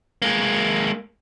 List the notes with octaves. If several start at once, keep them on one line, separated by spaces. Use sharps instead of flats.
G#3 A#3